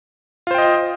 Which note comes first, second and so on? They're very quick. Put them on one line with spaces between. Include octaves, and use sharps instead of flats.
F4 C5 G5 D#5